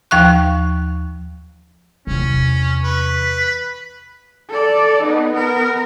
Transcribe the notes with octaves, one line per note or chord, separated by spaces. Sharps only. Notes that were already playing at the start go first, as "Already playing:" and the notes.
D#2 F3 F5 C#6 F#6
E2 C3 C#4
B4 C#6
B6
A4 D5
B3 D#4
B3 A#4